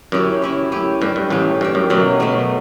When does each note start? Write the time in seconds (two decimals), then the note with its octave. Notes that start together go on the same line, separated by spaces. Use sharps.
0.12 F#2 C#4 E4 G4
0.42 C#4 E4 G4
0.72 A3 C#4 G4
1.01 G2 A3 C#4 G4
1.16 G2
1.30 A1 A2 A3 C#4 G4
1.61 G2 A3 C#4 G4
1.75 F#2
1.90 F#2 B2 F#3 A3
2.20 B2 F#3 A3